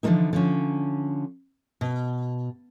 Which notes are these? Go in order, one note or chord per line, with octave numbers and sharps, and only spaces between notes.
D3 E3 F3 G#3 A#3 D#4
D3 F3 C#4
B2